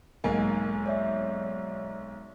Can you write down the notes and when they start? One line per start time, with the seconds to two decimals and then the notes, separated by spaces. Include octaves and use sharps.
0.24 B1 G#2 A#3 D#5 G#5
0.86 C#5 D5 E5